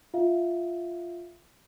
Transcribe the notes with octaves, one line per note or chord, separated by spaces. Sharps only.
F4 E5 F5